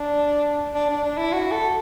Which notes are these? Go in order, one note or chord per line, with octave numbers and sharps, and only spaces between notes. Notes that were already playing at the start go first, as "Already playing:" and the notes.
Already playing: D4
D4
D4
D4
E4
F#4
A4